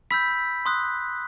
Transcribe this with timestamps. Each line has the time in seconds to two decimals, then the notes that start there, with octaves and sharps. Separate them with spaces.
0.11 B5 E6 G6 B6
0.66 C6 D#6 F#6